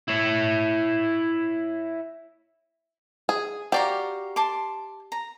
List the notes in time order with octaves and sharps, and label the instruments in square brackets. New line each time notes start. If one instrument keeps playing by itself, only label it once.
[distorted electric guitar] E4 C#5
[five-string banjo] G#4
[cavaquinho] F#4 F5 A#5 [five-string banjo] G4 D5
[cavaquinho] A5 C6 D6
A#5